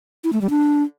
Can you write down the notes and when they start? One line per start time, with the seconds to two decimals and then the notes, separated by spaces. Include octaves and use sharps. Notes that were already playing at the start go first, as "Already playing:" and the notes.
0.24 E4
0.33 A3
0.41 G3
0.50 D4